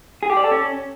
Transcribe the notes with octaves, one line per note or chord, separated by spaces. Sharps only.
G#4
G4
D5
A4
C#4